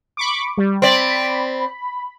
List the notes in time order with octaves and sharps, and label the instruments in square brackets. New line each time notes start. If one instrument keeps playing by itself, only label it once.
[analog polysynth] B5 C#6 D6
G3
[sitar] C4 D5 [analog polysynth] B5